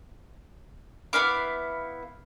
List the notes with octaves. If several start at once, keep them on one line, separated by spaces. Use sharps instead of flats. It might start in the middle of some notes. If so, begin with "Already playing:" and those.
B3 E4 F5 D6